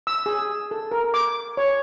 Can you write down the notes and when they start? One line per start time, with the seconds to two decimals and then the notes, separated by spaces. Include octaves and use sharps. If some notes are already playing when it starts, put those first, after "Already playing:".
0.07 E6
0.26 G#4
0.71 A4
0.91 A#4
1.14 D6
1.57 C#5